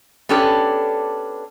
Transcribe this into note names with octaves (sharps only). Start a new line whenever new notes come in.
B3 C#4 D4 G4 A4